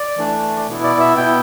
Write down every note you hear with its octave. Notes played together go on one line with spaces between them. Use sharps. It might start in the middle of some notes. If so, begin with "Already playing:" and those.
Already playing: D5
E3 A3 D4
B2 B3 E4
D5
E5
B2 B3 E4 G5